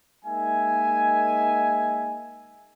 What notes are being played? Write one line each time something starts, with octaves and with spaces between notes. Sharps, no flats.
G#3 A#3 D#4 E5 G#5